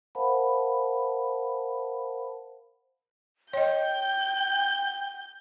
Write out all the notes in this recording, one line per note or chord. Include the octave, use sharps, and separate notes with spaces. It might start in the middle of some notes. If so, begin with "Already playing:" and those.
A#4 C5 F5 F#5 A5 B5
C#5 D#5 G5 G6